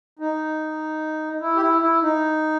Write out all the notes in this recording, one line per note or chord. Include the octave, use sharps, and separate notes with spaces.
D#4
E4
G4
E4
E4
D#4